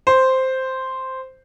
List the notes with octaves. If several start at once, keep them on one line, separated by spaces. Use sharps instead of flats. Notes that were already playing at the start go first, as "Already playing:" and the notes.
C5